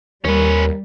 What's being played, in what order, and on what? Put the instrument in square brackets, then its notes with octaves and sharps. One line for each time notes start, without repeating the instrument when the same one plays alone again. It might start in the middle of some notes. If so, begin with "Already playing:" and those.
[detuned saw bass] D#2 [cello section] G3 [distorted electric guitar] C#4 B4 [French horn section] A#4